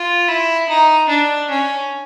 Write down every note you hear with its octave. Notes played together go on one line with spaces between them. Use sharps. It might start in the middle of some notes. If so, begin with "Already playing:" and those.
Already playing: F4
E4
D#4
D4
C#4